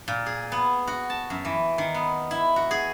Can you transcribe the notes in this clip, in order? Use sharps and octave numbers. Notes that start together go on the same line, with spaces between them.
A#2
G#4
B3
F#4
A5
F#2
E3
D#3
B3
E4
F#4
G#4